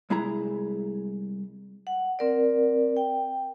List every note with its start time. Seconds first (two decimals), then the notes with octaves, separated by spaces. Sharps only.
0.10 C2 G#3 E4 G#4 A#5
1.87 F#5
2.19 C4 A#4 D5
2.97 G5